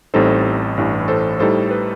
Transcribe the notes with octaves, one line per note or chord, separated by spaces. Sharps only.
A1 A2 G3 C4 D#4 A4 C5
A1 G2 E3
A4 C5
A2 G3 D#4 A4 C5
B4